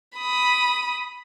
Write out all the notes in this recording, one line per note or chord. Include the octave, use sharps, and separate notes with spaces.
B5 D#6